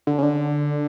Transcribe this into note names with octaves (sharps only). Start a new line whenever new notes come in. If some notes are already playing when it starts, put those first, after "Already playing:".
D3
C#3
D3